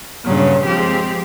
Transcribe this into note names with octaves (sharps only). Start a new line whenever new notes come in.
G2 A#2 C#3 F#3
F3 G#3 C4 G4